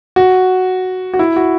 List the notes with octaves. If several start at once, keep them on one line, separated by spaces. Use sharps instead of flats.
F#4
F#4
E4
F#4